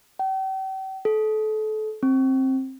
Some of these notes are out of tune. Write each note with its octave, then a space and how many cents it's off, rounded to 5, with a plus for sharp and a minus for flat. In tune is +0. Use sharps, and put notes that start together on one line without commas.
G5 -40
A4 -30
C4 +20